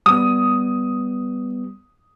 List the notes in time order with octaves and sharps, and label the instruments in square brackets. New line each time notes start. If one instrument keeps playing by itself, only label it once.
[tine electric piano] G3 B3 [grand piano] D#6